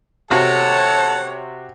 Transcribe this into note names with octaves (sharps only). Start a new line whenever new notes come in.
C3 F#4 A4 C#5 F#5 A5